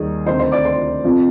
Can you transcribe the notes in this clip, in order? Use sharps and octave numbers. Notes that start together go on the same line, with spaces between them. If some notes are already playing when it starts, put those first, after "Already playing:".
Already playing: D#2 D#3 G3 G#4
D2 C3 D#3 C5 C6
C5 C6
D5 D6
C5 C6
F2 C3 F3